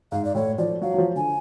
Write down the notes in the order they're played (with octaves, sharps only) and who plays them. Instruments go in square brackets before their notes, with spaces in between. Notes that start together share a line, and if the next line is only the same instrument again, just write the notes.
[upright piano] G#2 [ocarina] F5
[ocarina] D5
[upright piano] A2 [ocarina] C#5
[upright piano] F3 [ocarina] D5
[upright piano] F#3 [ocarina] F5
[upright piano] F#3
F3
[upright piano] D3 [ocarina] G#5